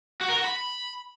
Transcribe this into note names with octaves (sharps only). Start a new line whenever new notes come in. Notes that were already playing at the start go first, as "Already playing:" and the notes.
F#4
A#4
F#4
B5